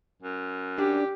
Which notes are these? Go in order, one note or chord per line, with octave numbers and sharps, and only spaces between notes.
F#2
D4 G4